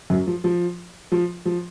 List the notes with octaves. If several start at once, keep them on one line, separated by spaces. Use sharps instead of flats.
F#2 F#3
F3
F3
F3
F3